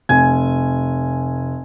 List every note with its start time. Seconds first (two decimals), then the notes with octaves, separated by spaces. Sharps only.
0.09 F1 G#5